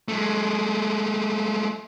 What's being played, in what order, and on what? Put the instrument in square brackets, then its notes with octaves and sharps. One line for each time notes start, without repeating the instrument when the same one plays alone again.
[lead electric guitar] G#3 A3